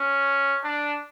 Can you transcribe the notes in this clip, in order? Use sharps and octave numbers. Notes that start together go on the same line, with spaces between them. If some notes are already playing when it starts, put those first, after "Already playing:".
Already playing: C#4
D4